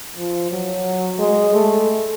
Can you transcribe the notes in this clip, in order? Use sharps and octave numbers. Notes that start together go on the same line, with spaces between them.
F3
F#3
G#3
A3